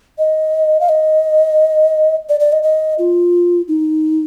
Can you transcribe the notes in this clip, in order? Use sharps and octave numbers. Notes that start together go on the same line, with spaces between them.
D#5
F5
D#5
D5
D5
D#5
D#5
F4
D#4